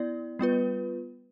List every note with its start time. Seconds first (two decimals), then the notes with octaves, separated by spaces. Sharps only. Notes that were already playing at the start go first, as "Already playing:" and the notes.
Already playing: B3 E4 D5
0.39 G3 B3 F4 B4